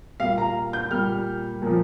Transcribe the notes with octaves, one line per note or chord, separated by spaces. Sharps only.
A#2 G3 F5
A#5
G6
A#2 G3 F6
A#2 F3